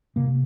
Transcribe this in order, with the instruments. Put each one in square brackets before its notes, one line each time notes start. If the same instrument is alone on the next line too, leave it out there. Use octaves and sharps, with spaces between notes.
[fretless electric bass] C3 A#3